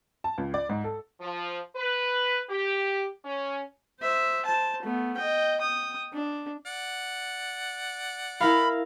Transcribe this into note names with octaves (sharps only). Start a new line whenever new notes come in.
A5
C#2
D5
G#2
A4
F3
B4
G4
C#4
C5 E5
C5 A5
A3 B3
D#5 G5
G5 D#6
D4
D5 F#5
E4 A#4 F5 B5